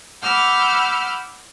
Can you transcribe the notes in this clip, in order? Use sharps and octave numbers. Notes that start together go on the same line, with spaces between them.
F#5 B5 D6 E6 F6 G6